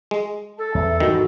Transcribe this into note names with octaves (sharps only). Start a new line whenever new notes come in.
G#3
A4 A5
E2 E5
G#2 D#3 E3 G3 F#4